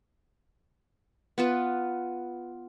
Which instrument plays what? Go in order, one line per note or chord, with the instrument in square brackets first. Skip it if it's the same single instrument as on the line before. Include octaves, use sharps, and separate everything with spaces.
[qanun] B3 F4 B4